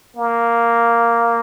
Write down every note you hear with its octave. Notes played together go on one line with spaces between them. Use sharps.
A#3